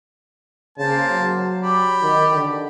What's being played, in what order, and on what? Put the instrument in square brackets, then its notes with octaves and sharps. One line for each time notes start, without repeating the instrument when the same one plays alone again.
[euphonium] C#3 [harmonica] A#3 C5 A5
[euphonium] F#3
[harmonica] G4 D5 B5
[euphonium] D#3
D3